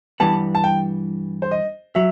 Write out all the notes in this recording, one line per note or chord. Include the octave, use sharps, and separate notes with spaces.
G2 E3 G3 B3 A5
A5
G5
C5
D#5
F#3 E5